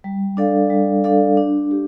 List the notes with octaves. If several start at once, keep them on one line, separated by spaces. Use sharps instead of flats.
G3
D4 A4 D5 F5
G3
D4 A4 D5 F5
D4
G4